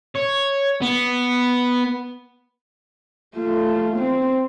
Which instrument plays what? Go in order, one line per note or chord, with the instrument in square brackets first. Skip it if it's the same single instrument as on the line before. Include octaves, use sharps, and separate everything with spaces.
[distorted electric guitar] C#5
B3
[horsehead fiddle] A3 F4
C4